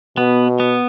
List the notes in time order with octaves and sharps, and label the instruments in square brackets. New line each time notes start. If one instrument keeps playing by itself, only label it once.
[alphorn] B2 [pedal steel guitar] B3
[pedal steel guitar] B3